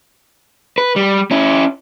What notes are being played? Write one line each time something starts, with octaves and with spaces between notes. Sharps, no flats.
B4
G3
C#4 E4